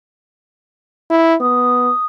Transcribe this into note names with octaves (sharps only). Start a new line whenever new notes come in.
E4
B3 D#6